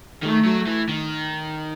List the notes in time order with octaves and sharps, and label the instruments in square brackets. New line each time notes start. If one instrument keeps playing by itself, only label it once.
[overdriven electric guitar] D#3 [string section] A3
[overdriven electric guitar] F#3
E3
D#3